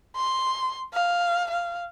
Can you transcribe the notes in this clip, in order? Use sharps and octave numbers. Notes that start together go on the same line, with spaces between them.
C6
F5
F5